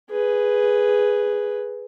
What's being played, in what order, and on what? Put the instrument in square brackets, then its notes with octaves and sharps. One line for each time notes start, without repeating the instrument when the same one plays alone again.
[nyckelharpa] G#4 B4